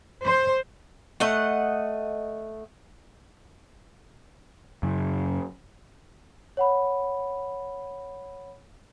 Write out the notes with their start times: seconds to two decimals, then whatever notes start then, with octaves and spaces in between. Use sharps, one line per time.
0.24 C5
1.20 A3 D#5 F#5
4.83 F#2 C#3
6.57 C#5 F#5 B5